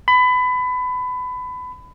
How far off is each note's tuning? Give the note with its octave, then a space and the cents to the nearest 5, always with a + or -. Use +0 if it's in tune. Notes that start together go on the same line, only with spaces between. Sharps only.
B5 +25